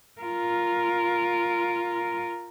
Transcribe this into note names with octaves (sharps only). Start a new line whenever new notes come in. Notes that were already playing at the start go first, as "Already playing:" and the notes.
F4 A#4